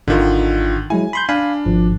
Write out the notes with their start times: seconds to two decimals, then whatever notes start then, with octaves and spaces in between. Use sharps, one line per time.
0.08 G#1 D3 D#3 F4
0.90 F#3 G#3 E4 G#5
1.13 B5 C6 G6
1.29 D4 F5 G#5 B5
1.66 G#1 F3